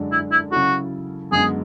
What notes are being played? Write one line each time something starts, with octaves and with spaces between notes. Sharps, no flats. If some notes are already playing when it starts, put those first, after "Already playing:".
Already playing: F#2 D3 G#3 D4 A4
E4
E4
C#3 F#3 C#4 E4 F#4 A4
F#2 D3 G#3 B3 G#4